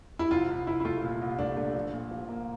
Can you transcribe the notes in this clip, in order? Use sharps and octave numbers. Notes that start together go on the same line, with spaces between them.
E4
C2 F4
C2
C2 E4
E4
A3 F4
A#2
C2
A3 D4
A3
F3
A#2
F3
A#3